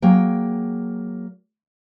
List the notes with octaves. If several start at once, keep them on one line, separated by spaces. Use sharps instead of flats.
F#3 A#3 G#4 G5